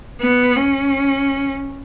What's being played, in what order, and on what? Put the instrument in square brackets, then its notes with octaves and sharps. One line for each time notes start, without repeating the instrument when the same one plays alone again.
[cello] B3
C#4